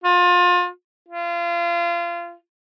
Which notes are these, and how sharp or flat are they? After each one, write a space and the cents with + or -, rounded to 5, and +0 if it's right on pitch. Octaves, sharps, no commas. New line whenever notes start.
F4 +30
F4 -30